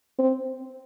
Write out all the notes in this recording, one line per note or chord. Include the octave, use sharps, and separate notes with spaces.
C4